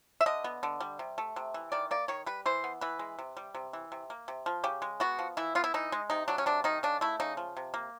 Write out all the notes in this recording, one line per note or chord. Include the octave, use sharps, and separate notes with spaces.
E5
D3 D#5
B3
D3
G3
C3
A3
C3
E3
D#3 D5
A#3 D5
D#3 C#5
G3 B4
E3 C5
B3
E3 B4
G#3
C3
G3
C3
E3
C3
A#3
C3
F3
C#3 G4
G#3
B3 F#4
F3
E3 E4
B3 F4
E4
E3 D#4
G#3
C3 D#4
F#3 D4
C#4
C3 D4
D#3 D#4
C#3 D4
A3 E4
C#3 D#4
F3
C3
A#3